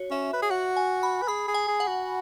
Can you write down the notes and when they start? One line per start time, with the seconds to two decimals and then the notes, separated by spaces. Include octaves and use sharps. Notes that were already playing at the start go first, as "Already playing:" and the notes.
Already playing: F#4 C#5
0.11 C#4 E5
0.33 B4
0.42 G#4
0.50 F#4 F#5
0.76 G#5
1.03 B5
1.22 B4
1.28 G#4 B5
1.48 G#4
1.54 G#5
1.68 G#4
1.80 F#5
1.87 F#4